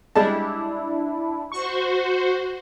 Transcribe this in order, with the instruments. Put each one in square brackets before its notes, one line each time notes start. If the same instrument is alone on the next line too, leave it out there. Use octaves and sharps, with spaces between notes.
[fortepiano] G3 G#3 A5 [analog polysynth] D4 E4
[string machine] F#4 C5 [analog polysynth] C#6